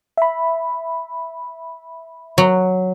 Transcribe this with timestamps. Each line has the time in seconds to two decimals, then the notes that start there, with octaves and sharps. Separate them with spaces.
0.17 E5 B5
2.38 F#3